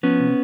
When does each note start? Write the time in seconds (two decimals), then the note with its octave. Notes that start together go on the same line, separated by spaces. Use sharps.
0.03 F3 B3 C#4
0.20 C3